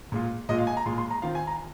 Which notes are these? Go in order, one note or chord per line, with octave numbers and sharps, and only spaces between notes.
A#2 G#3 F4
A#2 G#3 F4 D#5
F5
G#5
A#5
A#2 G#3 F4 C6
C6
A#5
D#3 C4 F4 F5
G#5
A#5